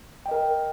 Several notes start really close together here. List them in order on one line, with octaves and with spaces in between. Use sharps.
G5 D#5 A#4